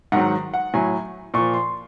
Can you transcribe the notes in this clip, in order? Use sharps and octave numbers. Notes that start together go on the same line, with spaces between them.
G#2 D#3 F#3 F#5
F#5
A2 F#3 G#5
A#2 F3 C#6
C6